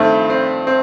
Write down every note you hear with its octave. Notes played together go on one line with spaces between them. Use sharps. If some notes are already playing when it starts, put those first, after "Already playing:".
Already playing: G2 D#3 A3 C4
C4
C4